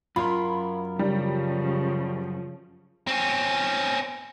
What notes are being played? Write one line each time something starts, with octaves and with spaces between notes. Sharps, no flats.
F#2 F4 A#4 B5 C6
C#3 F3 G3
C4 C#4